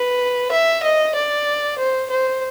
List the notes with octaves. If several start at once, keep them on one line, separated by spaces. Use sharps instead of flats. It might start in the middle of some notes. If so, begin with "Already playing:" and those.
Already playing: B4
E5
D#5
D5
C5
C5